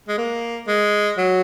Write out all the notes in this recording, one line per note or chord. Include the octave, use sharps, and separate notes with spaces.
G#3
A#3
G#3
F#3